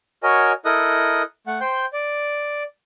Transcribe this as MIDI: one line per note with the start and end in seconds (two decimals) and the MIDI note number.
0.23 0.52 66
0.23 0.52 70
0.23 0.52 73
0.23 0.52 75
0.23 0.52 80
0.65 1.22 64
0.65 1.22 69
0.65 1.22 70
0.65 1.22 75
0.65 1.22 87
0.65 1.22 90
1.47 1.59 57
1.47 1.59 78
1.61 1.86 72
1.61 1.86 79
1.61 1.86 84
1.61 1.86 91
1.93 2.63 74